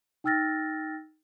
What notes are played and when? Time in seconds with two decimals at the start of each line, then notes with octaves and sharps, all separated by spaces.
0.24 D#4 G5 E6 F6 A6 A#6